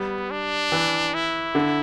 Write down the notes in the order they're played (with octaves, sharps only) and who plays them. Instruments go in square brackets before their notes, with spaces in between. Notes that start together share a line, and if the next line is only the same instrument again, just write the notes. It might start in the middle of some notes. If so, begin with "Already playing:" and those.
Already playing: [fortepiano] G3 [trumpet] B3
[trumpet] D4
[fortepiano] E3
[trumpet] E4
[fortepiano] D3